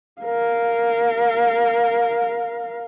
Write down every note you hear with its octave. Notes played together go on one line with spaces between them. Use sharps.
A#4 F5